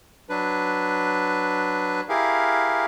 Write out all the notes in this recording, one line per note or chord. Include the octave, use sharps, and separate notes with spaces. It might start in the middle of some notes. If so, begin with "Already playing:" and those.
F#3 D4 B4
E4 G4 G#4 A#4 F5